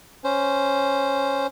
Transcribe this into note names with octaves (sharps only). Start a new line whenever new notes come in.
C#4 C5